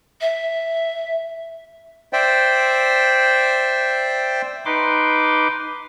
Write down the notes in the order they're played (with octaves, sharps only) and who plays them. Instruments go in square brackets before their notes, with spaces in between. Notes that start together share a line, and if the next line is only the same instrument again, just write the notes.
[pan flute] E5
[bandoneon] C5 D5 E5 G5
[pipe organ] D#4 B4 C6 D6